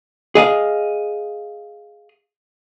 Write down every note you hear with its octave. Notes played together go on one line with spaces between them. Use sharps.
G#4 D#5 F5